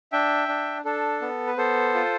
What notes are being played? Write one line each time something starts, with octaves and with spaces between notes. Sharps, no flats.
D4 E5 G5
D4
D4 A4
B3
B4
B3 A4 C5
F4